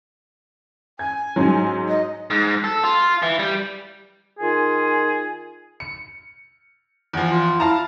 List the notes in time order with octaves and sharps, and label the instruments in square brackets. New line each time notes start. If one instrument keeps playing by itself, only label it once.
[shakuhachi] G#5 [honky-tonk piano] G#6
[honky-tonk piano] G#2 F#3
[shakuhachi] D#5
[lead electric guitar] G#2
A4
F4
E3
G3
[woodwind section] D#3 F4 G#4 G#5
[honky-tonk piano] C#7
E2 F3
[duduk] F4
[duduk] E4 [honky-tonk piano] F5 A5 A#5